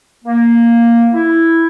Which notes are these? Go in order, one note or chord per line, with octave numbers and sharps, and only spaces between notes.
A#3
E4